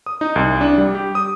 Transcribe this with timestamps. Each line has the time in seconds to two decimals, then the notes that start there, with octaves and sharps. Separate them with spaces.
0.06 D#6
0.21 D#4
0.36 C2
0.61 D4
0.78 G3
0.95 G4
1.15 D#6